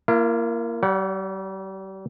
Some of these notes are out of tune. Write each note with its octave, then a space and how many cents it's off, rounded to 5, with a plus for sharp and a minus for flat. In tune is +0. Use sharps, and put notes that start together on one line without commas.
A#3 +0 E4 +45
G3 -35 C#5 +25 F#5 +0